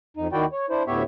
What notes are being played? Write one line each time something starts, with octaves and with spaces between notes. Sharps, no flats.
F2 D#4
D#2 D#3 E4 F#4 D5 G5
C#5
D4 E4 C5
D2 A2 B3 G4 C#5 E5